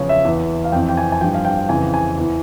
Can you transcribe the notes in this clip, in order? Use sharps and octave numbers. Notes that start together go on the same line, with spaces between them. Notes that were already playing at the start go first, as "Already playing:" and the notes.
Already playing: E2 C#3 F3 C#5
E5
E2 E3
F5
F2 E3 G5
G5
G#5
G#5
G2 F3 G5
F5
G5
F2 C#3 E3 G#5
G#5
E2 E3